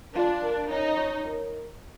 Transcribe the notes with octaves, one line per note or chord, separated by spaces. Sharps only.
D4 F4
A#4
C#4 D#4
C#5
A#4